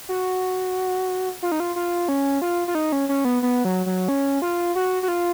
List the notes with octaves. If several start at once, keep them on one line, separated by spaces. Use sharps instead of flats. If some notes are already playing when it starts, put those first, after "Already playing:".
F#4
F4
D#4
F4
F4
C#4
F4
F4
D#4
C#4
C#4
B3
B3
F#3
F#3
C#4
F4
F#4
F#4
F4